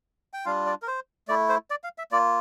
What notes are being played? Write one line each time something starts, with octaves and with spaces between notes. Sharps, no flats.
G5
G3 D4 F4 F5
D5
A#4
C5
A3 E4 D5
C5
D5
F5
E5
A#3 F4 D5